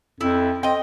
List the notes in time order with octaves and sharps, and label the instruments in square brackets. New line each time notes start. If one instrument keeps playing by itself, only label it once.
[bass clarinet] F2 [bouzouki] E4
[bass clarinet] C4 [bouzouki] D#5 G5